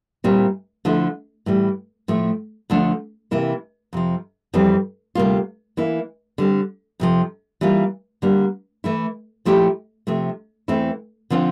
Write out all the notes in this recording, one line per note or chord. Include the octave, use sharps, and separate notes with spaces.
A#2 G3 C4 E4
D3 F3 A3 E4
A2 E3 G3
A2 F3 A3
D2 D3 F3 A3 D4
C3 E3 A#3 E4
F2 C3 F3
F2 E3 G3 C4
D2 C3 G3 A#3 F4
E3 A#3 E4
D3 G3 C4
F2 C3 F3
E3 G3 A#3 F4
D3 G3 A#3
E3 A3 E4
A#2 F3 A3 E4 G4
C3 F3 A3
E2 E3 A3 C4 E4
D3 F3 C4 F4